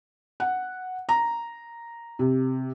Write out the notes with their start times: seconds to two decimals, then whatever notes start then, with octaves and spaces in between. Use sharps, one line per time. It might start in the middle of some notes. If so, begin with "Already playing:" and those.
0.40 F#5
1.09 A#5
2.19 C3